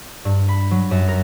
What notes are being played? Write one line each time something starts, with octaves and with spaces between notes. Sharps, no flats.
G2
B5
F#3
F#2
A#4